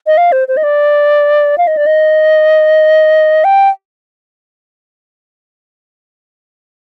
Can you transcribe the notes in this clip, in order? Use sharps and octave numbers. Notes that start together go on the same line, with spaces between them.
D#5
F5
C5
C5
D#5
D5
F5
D#5
D5
D#5
G5